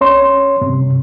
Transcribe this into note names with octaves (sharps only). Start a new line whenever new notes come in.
C#4 C#5 C6
G2 C3